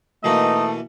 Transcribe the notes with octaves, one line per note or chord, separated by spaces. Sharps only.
B2 E3 A3 A#3 D#4 D#5